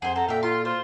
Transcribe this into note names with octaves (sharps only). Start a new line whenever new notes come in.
F2 G#4 C5 F#5
A4 F#5 A#5
A#2 A4 E5 F5 G5
F4 C6
F4 C5